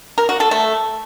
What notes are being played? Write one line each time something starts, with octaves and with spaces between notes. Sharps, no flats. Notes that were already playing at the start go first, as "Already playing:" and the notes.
A#4
F#4
A4
A3